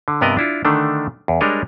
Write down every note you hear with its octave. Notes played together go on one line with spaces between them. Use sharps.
D3
G2 C3 B3 A#4 D5 D#5
D4 E4 F4
D3 D#3 A3 D4
E2
G3 G#3 D4 A#4 C#5 D#5